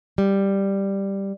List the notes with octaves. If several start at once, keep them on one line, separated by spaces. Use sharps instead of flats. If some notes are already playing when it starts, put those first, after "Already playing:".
G3